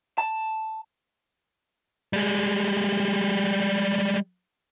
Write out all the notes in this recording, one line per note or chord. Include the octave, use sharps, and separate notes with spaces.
A5
G3 G#3